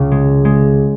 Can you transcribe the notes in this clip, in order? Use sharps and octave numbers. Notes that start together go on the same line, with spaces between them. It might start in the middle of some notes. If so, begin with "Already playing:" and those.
Already playing: C#2 C#3
G#3
G#3